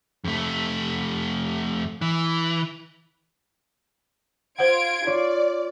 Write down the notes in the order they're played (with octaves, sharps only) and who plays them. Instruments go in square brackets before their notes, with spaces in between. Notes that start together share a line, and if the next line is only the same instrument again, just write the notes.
[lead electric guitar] F2 A3
E3
[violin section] F4 G#6 D7 [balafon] C5 F#5
[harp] F4 C#5 C7 [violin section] D5